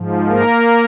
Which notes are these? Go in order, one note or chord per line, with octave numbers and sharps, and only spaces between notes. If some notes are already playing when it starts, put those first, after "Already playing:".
Already playing: G#2 F3
A#3 A#4